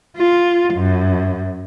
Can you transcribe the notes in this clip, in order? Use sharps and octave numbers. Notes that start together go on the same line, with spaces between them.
F4
F#2